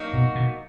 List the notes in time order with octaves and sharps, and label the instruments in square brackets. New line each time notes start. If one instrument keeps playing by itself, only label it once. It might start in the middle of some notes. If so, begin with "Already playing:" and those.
Already playing: [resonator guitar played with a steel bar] F#3 A#3 D#4 F#4
[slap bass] B2
B2